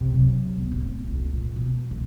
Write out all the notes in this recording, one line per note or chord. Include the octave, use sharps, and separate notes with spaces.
C3
F#3
B3
D1
C#2
A#2
B2
D2